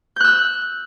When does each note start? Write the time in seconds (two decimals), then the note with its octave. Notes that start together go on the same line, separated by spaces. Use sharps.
0.16 G6
0.20 F#6
0.24 E6